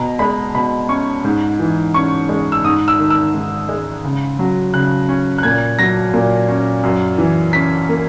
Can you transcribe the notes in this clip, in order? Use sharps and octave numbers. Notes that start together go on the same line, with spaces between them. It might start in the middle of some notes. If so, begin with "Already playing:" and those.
Already playing: B2 A#5
G#3 B5
B2 B5
C#4 C#6
G#2
E3
C#4 C#6
G#3
E6
G#2 D#6
E6
D#3
E6
G#2
G#3
C#3
F#3
C#3 F#6
C#4
F#6
A#2 G#6
F#3 A#6
A#2
C#4
F#2
E3
C#4 B6
A#3